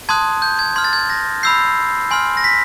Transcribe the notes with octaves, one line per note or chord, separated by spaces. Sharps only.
A5 C6 D#6 F#6 G#6
G6
G#6
C6 F6 G#6
A6
G#6
A#6
B5 E6 G6 C7
G#5 C6 F6
A#6
B6